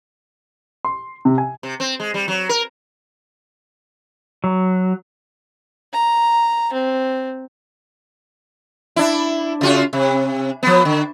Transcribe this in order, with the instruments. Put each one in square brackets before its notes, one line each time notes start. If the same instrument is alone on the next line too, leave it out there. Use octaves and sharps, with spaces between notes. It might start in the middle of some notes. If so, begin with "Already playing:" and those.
[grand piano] C6
C3
G#5
[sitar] C3
C4
G#3
G3
F#3
A#4
[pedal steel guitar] F#3
[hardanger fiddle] A#5
C4
[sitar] D4 E4
C#3 F4 F#4
C3
F3 B3
D3